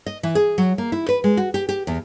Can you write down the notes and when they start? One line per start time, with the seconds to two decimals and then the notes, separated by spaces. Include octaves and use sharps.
0.06 D#5
0.23 E3
0.35 G#4
0.58 F#3
0.78 A#3
0.92 E4
1.09 B4
1.24 G#3
1.37 F#4
1.54 G4
1.69 G4
1.87 E2